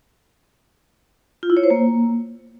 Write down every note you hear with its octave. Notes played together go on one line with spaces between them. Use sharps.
F4
E4
C#5
C5
A#3